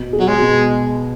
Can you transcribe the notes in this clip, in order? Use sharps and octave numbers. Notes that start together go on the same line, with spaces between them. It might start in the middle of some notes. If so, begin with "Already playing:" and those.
Already playing: B2
G#4
F#3
G#3
B2